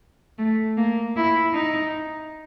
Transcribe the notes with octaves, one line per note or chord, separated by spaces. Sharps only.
A3
A#3
E4
D#4